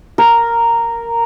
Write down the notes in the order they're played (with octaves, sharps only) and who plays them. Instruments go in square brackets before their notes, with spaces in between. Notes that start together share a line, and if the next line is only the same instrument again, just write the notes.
[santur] A#4